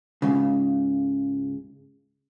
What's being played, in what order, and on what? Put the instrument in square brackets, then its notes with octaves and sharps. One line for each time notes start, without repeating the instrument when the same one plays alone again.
[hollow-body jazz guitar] C#2 G#2 C#3